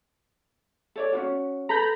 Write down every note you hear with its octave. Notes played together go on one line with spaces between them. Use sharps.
A4 C#5 D5
C#4 F4 F#4
A4 B4 A#5 B5 G6